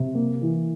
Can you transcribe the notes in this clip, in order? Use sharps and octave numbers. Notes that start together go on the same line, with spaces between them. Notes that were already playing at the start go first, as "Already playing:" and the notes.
Already playing: C3
A#3
E3